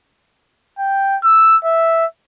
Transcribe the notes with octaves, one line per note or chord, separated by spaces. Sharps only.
G5
E6
E5